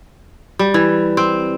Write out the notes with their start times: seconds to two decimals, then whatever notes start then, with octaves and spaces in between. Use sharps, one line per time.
0.59 G3
0.74 E3
1.17 C4